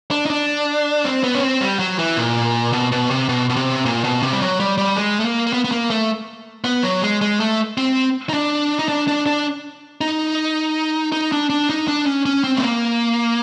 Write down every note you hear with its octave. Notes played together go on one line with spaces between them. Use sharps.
D4
D#4
D4
C4
B3
C#4
C4
G3
F#3
E3
A#2
B2
B2
C3
B2
B2
C3
A#2
B2
C3
G3
F#3
G3
G3
G#3
A3
A#3
A#3
B3
B3
A#3
A3
B3
F#3
G#3
G#3
A3
C4
D#4
D4
D#4
D4
D4
D4
D#4
D#4
D4
D4
D#4
D4
C#4
C#4
C4
A3
A#3